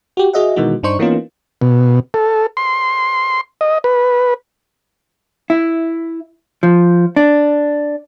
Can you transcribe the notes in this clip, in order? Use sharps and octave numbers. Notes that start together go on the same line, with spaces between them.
F#4 G4
F#4 G#4 D#5 E5 F#5
B2 D#3 E3 G#3 D#4 F#4
G2 D4 D#4 C5 C#6 C#7
E3 A#3 B3 C#4 D#4 F4
B2
A4
C6
D#5
B4
E4
F3
D4